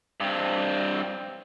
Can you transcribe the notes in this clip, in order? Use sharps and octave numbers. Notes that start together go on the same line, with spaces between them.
G2 C4